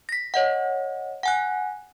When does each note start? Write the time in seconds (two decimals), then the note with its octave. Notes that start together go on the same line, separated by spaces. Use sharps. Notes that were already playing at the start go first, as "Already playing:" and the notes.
0.09 A#6 B6
0.34 C#5 D#5 F#5
1.23 F#5 G#5 F#6